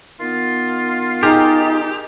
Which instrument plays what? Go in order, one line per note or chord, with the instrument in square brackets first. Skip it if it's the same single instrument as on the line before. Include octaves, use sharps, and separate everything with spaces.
[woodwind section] D#3 B3 F4
[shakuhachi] D#4 [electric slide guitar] G4 [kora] G#4 A#4